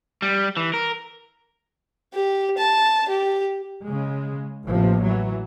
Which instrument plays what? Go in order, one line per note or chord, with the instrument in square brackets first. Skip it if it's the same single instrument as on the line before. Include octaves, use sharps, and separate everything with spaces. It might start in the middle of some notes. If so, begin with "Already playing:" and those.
[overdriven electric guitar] G3
E3
A#4
[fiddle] G4
A5
G4
[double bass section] C#3 G#3
A1 C3 F3 A#3
E3 F#3